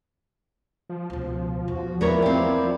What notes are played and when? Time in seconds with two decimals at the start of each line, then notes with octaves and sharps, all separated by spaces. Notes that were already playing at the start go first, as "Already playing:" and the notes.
0.90 F3
1.10 C#2 B2
1.68 D#1 E2 F#4
2.01 E2 A#3 B3 E4 A#4 C#5 D5
2.22 C4 G4